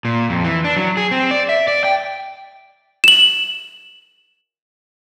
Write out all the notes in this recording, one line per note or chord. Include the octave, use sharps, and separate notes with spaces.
A#2
F2
E3
D4
F#3
G#4
C4
D5
E5
D5
G5
E7 F#7